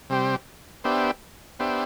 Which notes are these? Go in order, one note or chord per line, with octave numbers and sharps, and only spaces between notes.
C3 G3 C4 G4 C5
B3 D4 G4 C5 E5
B3 D4 G4 C5 E5